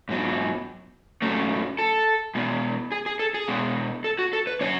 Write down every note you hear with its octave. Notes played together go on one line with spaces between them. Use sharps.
G#2 F#3 B3
G#2 F#3 A3 C#4
A4
B2 G#3 B3
G#4
G#4
A4
G#4
B2 G#3 B3
A4
F#4
A4
B4
B2 F#3 C#4 C#5